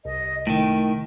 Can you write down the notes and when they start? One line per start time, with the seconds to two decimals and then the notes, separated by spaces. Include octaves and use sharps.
0.05 C2 D#5
0.47 A2 D#3 G5